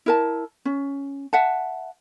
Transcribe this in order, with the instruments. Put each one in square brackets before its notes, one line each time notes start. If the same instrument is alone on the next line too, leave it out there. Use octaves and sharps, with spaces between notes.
[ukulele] E4 A#4 A5
C#4
E5 F#5 A5